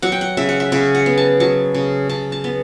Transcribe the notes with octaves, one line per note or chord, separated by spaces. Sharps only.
F#3 F#5
G5
F#5
C#3 E5
F#5
E5
C#3 E5
F#5
B3
A5
F#3 A5
C#3
C#3 A5
A5
B3